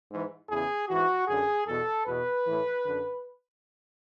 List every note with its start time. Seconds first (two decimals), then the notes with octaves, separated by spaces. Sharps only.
0.11 G#2 E3
0.50 E2 C#3 E3 G#4
0.89 G#2 E3 F#4
1.28 F#2 D3 G#4
1.67 E2 B2 A4
2.06 E2 B2 B4
2.45 A2 E3
2.85 F#2 D3